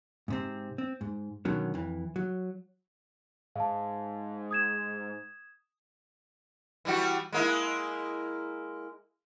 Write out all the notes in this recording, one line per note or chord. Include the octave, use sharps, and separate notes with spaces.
G#2 C3 C4
C4
G#2
B2 D3 D#3 F#3 C#4
F2 E3
F#3
G#2 F5 A5
D#6 G#6 E7
E3 G3 F#4
G#3 A#3 E4